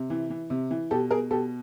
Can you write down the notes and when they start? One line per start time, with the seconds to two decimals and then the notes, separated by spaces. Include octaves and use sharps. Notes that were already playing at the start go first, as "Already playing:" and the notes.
Already playing: C3
0.10 E3
0.30 E3
0.50 C3
0.71 E3
0.91 B2 G4 A4
1.11 B2 G#4 A#4
1.31 B2 G4 A4